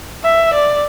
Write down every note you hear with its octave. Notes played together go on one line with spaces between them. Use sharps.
E5
D5